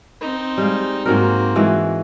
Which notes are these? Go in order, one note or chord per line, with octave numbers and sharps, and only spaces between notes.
C4 D#4
G3 G#3 F5
G#2 A#3 C4 F#4 A#4
E3 G#3 F#4